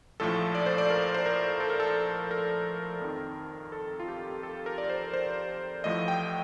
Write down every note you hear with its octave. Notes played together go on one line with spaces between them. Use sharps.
A#1 A2 F3 A4
D5
C5
D5
A#4
C5
A#4
A4
A#4
A4
A#4
F2 D#3
A4
F4
G4
A4
A#4
D5
C5
C5
A1 A2 F3 D#5
G5